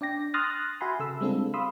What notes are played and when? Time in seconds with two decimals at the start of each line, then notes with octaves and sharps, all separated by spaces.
0.01 D4 D5 G5 A#6
0.34 C6 D#6 F6 F#6 A6 A#6
0.81 F#4 E5 F#5 G#5 B5 C6
1.00 C#3 A4 E6
1.21 G3 G#3 C4 D4 F4 A4
1.54 F5 B5 C6 D#6 E6